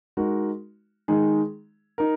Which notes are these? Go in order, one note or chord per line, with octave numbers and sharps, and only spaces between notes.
G#3 D#4 F#4 A#4
D#3 G#3 D#4 G#4
D#4 A#4